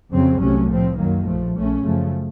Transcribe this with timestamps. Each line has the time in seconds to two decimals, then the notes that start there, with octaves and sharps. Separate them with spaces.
0.12 F2 C#3 F#3 C4
0.41 C2 C3 F#3 A3 C#4
0.70 A2 F3 C4
0.97 F#2 D#3 F#3 A#3
1.26 A#1 A2 F3 A3
1.55 A#1 A#2 A3 C#4
1.83 F#2 C#3 F3 A3